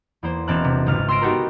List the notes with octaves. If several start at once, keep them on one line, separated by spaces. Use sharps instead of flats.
E2 A#3 C5
E1 A#3 C4 A5 F6 F#6
C3
G#1 C#2 G#3 F6 A6
C6 E6 F6 A#6 C7 D7
B3 D#4 F#4 G4 A4 A#4